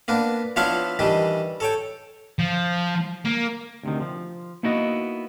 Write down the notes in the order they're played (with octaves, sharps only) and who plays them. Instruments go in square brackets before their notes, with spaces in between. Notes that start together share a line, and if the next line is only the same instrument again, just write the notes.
[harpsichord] A#3 B3 D4
F3 B3 D4 E4 C#5 F5
D#3 E3 G3 D4
A4 C#5 G5
[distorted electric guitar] F3
A#3
[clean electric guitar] D2 C3 D#3
F3
A#3 B3 D#4 E4 F#4 D#5